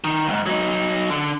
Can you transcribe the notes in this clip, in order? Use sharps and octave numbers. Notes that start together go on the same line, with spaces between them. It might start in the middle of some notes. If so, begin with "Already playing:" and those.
D#3
C#2 G#2
F#3 D#4
D3